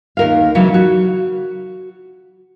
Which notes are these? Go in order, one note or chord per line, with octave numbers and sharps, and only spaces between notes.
D#2 A#4 F5
C#3 E3 F#3
F#4